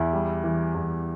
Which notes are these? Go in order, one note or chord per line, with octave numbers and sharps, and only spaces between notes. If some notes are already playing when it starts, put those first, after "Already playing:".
Already playing: E2 E4
G3
E3
E2